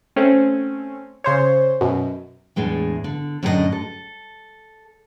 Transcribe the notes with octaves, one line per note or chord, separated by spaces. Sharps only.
A3 C4 C#4
C#3 C5 C#5
F#2 B2
E2 A2 G#3 D4
D3
F#2 A2 D3 D4 G#4 D#5
A4